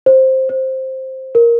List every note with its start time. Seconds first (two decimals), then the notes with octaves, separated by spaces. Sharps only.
0.06 C5
0.49 C5
1.35 A#4